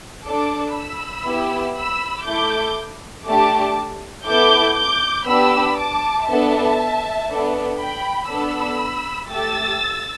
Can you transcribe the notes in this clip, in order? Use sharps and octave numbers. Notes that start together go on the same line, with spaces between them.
D4 A4 A5 D6
B5 E6
B3 E4 G4
B5 E6
A3 E4 A4 D6 G6
A3 D4 G4 A5 D6
B3 E4 A4 D6 G6
D6 G6
B3 D4 G4 B5 E6
A5 D6
B3 D4 A4 E5 A5
B3 D4 A4
G5 B5
B3 D4 A4 B5 E6
A3 G4 E6 A6